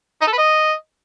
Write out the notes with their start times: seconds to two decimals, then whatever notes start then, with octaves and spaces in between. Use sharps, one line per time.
0.22 D#4
0.27 A4
0.33 B4
0.38 D#5